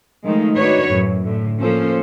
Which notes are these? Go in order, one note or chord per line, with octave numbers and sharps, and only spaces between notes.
D#3 F3 G#3 A3 D#4
D4 D#4 F#4 B4 C#5
F#2 A2
A2 D3
F3 A#3 C#4 A4 C5